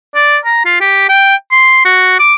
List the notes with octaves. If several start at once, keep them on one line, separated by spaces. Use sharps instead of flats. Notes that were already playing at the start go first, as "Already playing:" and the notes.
D5
A#5
F4
G4
G5
C6
F#4
D6